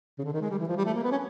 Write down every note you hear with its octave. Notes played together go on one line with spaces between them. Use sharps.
C#3
D3
D#3
G#3
G3
E3
F3
G3
A3
A#3
B3
C#4